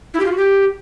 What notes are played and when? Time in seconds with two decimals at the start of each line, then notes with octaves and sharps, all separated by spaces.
0.14 E4
0.20 G4
0.25 F4
0.31 F#4
0.37 G4